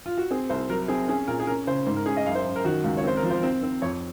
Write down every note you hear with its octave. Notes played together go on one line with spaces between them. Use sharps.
F4
F#4
C4 G#4
C2 C5
F#3 A#4
C4 G#4
C#4 G#4
A#2 A#4
G#4
C#4 A#4
C#3 C5
G#2 C5
A#4
C#4 G#4
D#5
F#2 F5
C5
F#2
A#4
D#3 F#4
C#2
C#5
C4 C5
A#4
F3
C5
C4
C4
F2 C#5